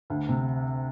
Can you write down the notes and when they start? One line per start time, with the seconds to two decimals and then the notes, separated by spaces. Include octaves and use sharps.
0.10 D2
0.29 C3